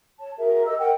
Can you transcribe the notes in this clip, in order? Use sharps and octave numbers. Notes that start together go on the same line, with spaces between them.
C#5 A5
F#4 G#4 A#4 E5
G4 D#5 E6
A#4 D#5 F#5 G5